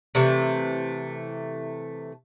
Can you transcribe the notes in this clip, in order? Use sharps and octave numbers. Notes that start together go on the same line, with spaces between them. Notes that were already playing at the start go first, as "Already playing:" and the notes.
C3 E3 A3